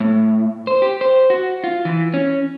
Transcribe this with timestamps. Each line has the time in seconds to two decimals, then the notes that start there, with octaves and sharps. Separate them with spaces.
0.01 A2
0.67 C5
0.82 G4
1.01 C5
1.30 F#4
1.64 F4
1.85 E3
2.14 C#4